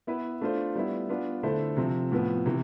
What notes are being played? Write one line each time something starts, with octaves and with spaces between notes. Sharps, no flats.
B3 E4 B4
A3 D4 F4 C5
G3 B3 E4
B3 D4 F4
D3 A3 E4 A4 C5
C3 F3 C4
A2 F3 B3
C3 E3